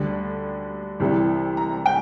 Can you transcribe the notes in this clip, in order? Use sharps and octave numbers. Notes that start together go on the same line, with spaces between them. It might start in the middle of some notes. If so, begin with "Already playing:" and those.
Already playing: D2 D3 G3
C2 C3 E3 G3
A#5
G5